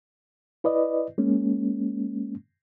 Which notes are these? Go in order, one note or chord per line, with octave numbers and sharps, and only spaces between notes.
E4 B4 D5 D#5
G#3 A#3 C#4